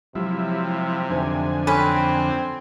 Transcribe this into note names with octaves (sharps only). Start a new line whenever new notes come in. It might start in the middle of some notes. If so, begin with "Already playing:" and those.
C3 F3 F#3 G#3 E4 G4
F2 D3 D#4 C5 G#5
C4 C#4 A4 B4